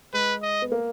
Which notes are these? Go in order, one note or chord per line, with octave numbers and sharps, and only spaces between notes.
G#3 B4
D#5
B3
A#3